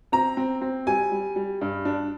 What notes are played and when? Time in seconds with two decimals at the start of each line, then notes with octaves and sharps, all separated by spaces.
0.12 C4 A#5
0.37 C4
0.61 C4
0.87 G3 G#5
1.12 G3
1.36 G3
1.61 G2
1.85 D4